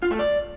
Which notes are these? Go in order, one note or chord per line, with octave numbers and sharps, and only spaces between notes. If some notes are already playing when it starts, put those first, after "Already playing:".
F4
A3
D5